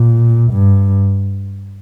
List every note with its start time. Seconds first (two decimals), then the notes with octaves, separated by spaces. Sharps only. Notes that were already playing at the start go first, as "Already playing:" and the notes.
Already playing: A#2
0.52 G2